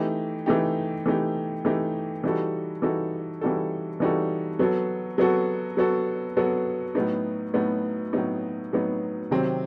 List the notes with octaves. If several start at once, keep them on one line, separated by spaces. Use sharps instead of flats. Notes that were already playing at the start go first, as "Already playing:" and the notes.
Already playing: E3 A3 D#4 G4
E3 A3 D#4 G4
E3 A3 D#4 G4
E3 A3 D#4 G4
E3 G3 D#4 F#4 A4
E3 G3 D#4 F#4 A4
E3 G3 D#4 F#4 A4
E3 G3 D#4 F#4 A4
F#3 B3 F#4 A4
F#3 B3 F#4 A4
F#3 B3 F#4 A4
F#3 B3 F#4 A4
A2 F#3 B3 D#4
A2 F#3 B3 D#4
A2 F#3 B3 D#4
A2 F#3 B3 D#4
C3 D#3 F#3 C4